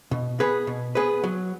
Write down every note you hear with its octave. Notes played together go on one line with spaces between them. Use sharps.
B2
B3 G#4 B4
B2
B3 G#4 B4
F#3